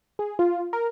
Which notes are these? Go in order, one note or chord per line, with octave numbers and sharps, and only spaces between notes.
G#4
F4
A#4